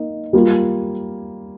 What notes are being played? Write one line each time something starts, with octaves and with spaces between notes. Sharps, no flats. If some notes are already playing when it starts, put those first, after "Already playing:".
Already playing: A#3 D#4
G3 A#3 F4